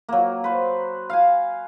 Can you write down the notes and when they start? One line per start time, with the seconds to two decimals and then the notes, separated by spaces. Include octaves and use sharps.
0.09 F#3 A#3
0.44 B4 C5
1.10 F5 G#5